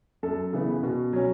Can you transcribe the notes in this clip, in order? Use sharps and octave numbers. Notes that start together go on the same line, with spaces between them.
F#2 A4
C#3 E3 B3
B2
F#3 C#4